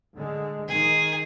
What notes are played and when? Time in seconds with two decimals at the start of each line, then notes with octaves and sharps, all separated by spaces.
0.16 D3 G#3
0.68 D#3 G#4